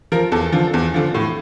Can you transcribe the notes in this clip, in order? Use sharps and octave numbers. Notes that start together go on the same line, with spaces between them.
F3 A#4
E2 A4
D3 F3
E2
D3 F3
A2